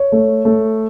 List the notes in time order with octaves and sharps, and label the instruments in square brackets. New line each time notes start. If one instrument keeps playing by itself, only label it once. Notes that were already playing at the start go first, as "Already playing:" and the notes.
Already playing: [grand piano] C#5
A3
A3